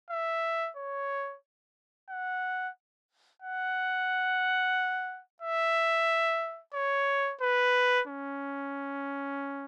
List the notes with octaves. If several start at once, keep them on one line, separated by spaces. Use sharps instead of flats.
E5
C#5
F#5
F#5
E5
C#5
B4
C#4